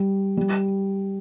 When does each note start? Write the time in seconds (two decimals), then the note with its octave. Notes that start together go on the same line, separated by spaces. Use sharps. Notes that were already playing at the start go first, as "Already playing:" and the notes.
Already playing: G3
0.37 G3